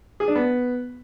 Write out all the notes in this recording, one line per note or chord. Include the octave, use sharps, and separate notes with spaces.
G#4
D4
B3